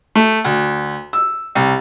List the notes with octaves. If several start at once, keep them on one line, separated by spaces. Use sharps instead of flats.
A3
D2
E6
C2